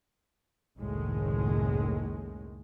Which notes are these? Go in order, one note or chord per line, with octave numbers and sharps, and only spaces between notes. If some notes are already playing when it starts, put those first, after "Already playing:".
F#1 C#2 A2 D#3 G#3